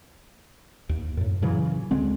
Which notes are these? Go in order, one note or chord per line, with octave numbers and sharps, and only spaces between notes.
D#2
F#2 A2
A#2 C#3 E3 F#3
D2 D3 G#3 C4